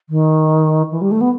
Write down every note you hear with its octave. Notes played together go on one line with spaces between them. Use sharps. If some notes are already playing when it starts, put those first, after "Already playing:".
D#3
E3
G3
A3
B3